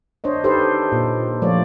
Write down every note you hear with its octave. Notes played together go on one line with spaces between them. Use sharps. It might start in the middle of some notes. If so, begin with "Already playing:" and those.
D4 C5 C#5 D#5
D#4 G4 A4 B4 C5
A#2
F3 A3 F4 C#5 D5